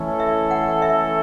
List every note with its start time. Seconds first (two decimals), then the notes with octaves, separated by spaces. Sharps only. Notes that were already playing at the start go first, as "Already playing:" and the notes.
Already playing: E3 A3 C#4 E4 A4
0.20 E5
0.51 F#5
0.82 E5